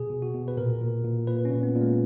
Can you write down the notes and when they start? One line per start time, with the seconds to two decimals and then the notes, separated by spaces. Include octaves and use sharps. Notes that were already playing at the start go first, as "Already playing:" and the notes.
Already playing: B2 G#4
0.10 B2
0.22 F#4
0.34 B2
0.48 B4
0.57 A#2 A#4
0.81 A#2
1.04 A#2
1.27 A#2 B4
1.45 C#4
1.51 A#2
1.63 B3
1.75 A#2
1.81 G#3